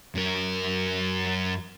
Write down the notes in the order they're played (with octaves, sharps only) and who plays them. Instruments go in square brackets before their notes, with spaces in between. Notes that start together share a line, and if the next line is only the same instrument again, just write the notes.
[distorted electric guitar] F#2 A#4